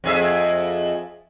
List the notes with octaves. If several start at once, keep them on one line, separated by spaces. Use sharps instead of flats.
F2 G#4 E5